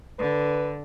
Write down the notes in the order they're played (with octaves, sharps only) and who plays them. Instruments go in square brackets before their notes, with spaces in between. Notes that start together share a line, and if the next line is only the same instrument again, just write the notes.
[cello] D3 [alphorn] B4